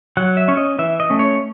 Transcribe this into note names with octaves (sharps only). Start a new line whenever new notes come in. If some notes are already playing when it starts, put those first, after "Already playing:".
F#3 F#5
E5
C#4 C#5
D#5
E3 E5
D#5
A3 C#4
C#5